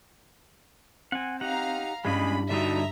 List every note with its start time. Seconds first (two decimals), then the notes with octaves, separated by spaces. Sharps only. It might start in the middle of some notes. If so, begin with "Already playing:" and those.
1.12 C4 F#5 G#5
1.41 D#4 G4 F5 F#5 A#5
2.05 G2 G3 G#3 C#4 E4 G#4 D#5 B5
2.50 D3 G3 D4 D#4 F#4 D#5 E5 A#5